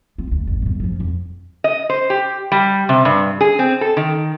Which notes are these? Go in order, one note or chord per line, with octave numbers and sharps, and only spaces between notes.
C4 F4
D2
A1 F2
G1 C3
F#2 F3
F2
D#5
C5
G4
G3
C3
G2
G#4
C4
A4
D#3